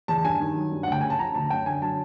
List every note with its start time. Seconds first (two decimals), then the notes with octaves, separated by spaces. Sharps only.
0.08 E2 A5
0.24 G2 G#5
0.40 D#3
0.56 F#3
0.72 G2
0.83 F#5
0.88 D2 G5
1.01 C#3 G#5
1.10 A5
1.19 F3 A#5
1.35 D2 A5
1.50 F#2 G5
1.66 D3 G#5
1.82 F#3 A5